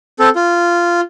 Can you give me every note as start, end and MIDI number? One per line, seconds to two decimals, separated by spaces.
0.19 0.29 60
0.19 0.29 69
0.36 1.01 65